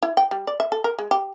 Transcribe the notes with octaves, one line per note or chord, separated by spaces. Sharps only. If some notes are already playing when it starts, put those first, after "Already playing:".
E4
G5
G3
D5
E5
A4
A#4
G#3
G4